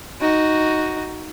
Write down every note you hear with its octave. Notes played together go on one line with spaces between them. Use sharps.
D#4 F#4